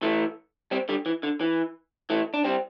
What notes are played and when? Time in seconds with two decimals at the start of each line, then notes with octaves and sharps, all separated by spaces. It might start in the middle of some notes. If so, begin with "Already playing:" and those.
0.03 E3 A3
0.71 G3 C4
0.89 D3 G3
1.06 E3
1.23 D3
1.41 E3
2.10 E3 A3
2.34 D4
2.44 G3 C4